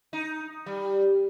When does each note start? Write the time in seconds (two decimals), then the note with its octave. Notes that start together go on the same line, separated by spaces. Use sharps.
0.13 D#4
0.66 G3